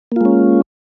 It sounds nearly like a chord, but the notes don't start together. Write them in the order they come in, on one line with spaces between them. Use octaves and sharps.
A#3 F4 G#3 C#4